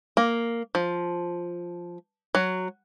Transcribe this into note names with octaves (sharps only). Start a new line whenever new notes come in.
A#3
F3
F#3